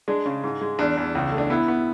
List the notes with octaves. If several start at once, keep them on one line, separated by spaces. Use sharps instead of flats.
G#3 D4
C#3
G#2
G#3
E2 D4
E2
C#2
A3
D4
B3 E4
B3